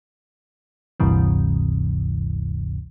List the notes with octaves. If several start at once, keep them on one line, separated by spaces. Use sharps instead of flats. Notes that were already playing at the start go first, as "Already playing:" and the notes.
G1 D2 G2 C3 E3